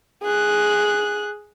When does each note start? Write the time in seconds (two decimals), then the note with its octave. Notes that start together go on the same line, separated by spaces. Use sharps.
0.23 G#4 F#6